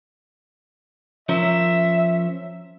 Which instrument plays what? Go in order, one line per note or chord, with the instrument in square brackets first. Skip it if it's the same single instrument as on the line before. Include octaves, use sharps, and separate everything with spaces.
[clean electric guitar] F3 C#4 A#4 [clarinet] E5